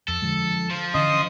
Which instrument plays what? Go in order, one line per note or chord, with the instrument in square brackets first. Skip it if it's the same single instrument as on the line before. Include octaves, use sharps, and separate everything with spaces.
[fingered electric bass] F2 [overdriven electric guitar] A4
[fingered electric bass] D3 F3 G#3
[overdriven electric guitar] F3
[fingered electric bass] D3 E3 C#4 [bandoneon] D#5 C6 D#6